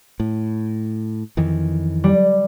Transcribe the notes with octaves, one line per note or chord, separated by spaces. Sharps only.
A2
F2 D#3 E3
G3